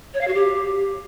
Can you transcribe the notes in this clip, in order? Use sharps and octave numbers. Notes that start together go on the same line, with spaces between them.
C#5
F5
F#4
G4